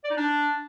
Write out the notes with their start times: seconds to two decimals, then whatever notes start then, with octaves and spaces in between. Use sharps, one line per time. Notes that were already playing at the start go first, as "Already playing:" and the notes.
0.04 D5
0.11 D#4
0.17 D4